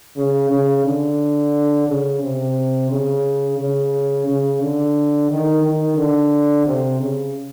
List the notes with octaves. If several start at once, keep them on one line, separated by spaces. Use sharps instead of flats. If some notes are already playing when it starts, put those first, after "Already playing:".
C#3
C#3
D3
C#3
C3
C#3
C#3
C#3
D3
D#3
D#3
D3
C3
C#3